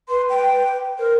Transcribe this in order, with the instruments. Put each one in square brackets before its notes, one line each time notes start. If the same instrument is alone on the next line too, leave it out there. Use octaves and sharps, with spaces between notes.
[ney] B4 [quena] C6
[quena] G5
[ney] A#4 [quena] C5